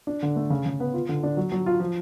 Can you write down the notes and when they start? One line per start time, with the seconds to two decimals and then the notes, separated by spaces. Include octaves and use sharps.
0.07 D4
0.22 D3
0.36 A3
0.50 C#3
0.66 C#3
0.80 B3
0.94 F4
1.09 D3
1.23 D4
1.37 F#3
1.52 F#3
1.66 F4
1.80 F3